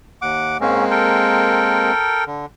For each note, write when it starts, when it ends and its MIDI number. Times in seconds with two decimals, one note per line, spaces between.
0.22 0.57 39
0.22 0.57 78
0.22 0.57 86
0.60 0.85 44
0.60 1.92 56
0.60 1.92 58
0.60 1.92 60
0.60 0.85 61
0.91 2.24 69
0.91 2.24 70
0.91 2.24 79
2.26 2.46 50